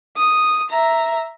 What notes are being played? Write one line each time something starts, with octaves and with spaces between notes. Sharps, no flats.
D#6
E5 A#5